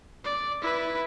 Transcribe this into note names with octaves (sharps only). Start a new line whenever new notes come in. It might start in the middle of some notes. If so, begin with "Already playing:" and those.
D5
E4 B4